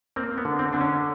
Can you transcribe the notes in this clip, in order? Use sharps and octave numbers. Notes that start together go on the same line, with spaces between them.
A#3 C4
B3
D3
C4
D3 D4
C#4